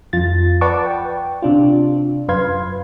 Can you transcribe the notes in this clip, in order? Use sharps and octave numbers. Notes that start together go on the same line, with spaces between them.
F2 F4 A6
B4 D5 F#5 A5 C#6 D6
G5
C3 D4 F4
F#2 B4 F5 C6 G#6